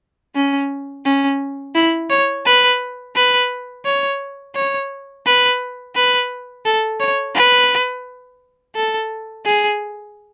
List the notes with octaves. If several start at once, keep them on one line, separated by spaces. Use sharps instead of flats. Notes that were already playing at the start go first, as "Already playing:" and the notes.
C#4
C#4
E4
C#5
B4
B4
C#5
C#5
B4
B4
A4
C#5
B4
A4
G#4